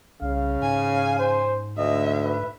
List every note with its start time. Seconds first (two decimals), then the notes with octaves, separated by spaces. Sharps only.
0.22 C2 C#3 F5
0.62 G#2 G#5
1.19 C5
1.77 D2 D#5 E5
2.25 B4